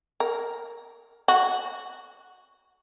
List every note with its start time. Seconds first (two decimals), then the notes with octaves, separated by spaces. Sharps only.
0.20 A#4
1.28 F#4